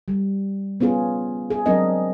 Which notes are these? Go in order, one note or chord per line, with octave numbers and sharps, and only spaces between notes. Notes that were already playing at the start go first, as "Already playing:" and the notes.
G3
B3 C#4 F4 G#4
G#4
F#3 G#3 C4 D4 A#4 D#5